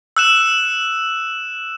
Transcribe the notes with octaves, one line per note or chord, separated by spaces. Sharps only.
E6 F#6 E7